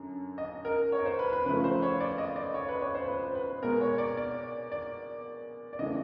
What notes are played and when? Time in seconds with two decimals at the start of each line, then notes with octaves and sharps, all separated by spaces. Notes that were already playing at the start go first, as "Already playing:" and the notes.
Already playing: F#2 D3
0.38 D#5
0.65 A#4
0.92 C#5
1.06 C5
1.19 B4
1.33 B4
1.46 C#3 F3 A3 B4
1.64 C5
1.82 C#5
2.00 D5
2.18 D#5
2.36 D5
2.54 C#5
2.68 B4
2.81 C#5
2.94 C5
3.08 B4
3.24 C5
3.35 B4
3.62 B2 G#3 B3 A#4
3.81 C#5
3.98 D5
4.17 D5
4.72 D5
5.73 D5
5.79 C#3 E3 A3 D#5